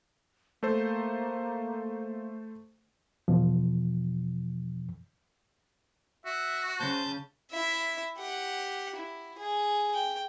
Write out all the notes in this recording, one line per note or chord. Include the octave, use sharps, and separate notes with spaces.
A3 A#3 A4 C5
E2 B2 F3
F#4 E5
C#3 C5 A5 G6
E4 E5
G4 F#5
E4
G#4
G5